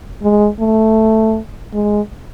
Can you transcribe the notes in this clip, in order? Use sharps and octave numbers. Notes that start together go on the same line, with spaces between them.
G#3
A3
G#3